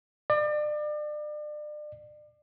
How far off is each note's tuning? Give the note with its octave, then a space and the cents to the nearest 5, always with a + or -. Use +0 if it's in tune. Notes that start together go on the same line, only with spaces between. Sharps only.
D5 +35